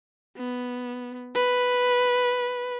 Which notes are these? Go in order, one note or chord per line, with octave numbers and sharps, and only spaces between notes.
B3
B4